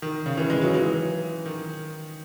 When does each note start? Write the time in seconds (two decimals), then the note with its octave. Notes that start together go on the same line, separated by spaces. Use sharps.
0.02 D#3
0.26 C#3
0.37 E3
0.50 G#3
0.61 F#3
0.74 E3
1.46 D#3